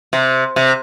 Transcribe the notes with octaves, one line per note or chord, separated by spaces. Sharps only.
C3
C3